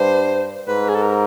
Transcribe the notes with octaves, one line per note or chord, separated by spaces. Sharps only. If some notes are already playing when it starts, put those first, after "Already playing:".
Already playing: G2 C5
G#2 B4
G#4
A4
A#4